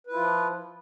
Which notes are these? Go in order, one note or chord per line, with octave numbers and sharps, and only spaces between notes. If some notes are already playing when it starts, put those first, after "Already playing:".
F3 E4 F4 B4